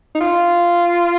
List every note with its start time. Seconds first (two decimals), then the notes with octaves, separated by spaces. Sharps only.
0.15 D#4
0.21 F4